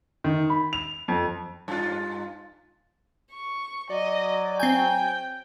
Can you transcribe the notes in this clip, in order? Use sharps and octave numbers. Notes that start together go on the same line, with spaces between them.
D#3
B5
F7
F2
G2 F4
C#6
F#3 D5 D#5
C4 G5 G#5 G6